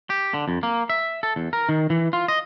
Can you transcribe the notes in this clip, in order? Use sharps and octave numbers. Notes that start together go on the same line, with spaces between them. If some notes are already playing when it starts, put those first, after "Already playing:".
G4
D3
F2
A#3
E5
A4
E2
A#4
D#3
E3
F4
D#5